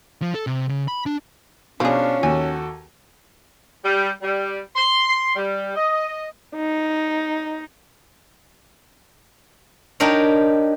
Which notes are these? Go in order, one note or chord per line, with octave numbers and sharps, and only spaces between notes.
F3
A4
C3
C#3
B5
D4
B2 F3 C#4 D4 G#4 F5
D#2 F#4 A4 G#5
G3
G3
C6
G3
D#5
D#4
D4 D#4 G4 A#4 C#5